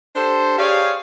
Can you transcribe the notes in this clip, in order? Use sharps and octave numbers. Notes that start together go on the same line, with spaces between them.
D4 G4 A4 C5
G4 G#4 C#5 D5 F5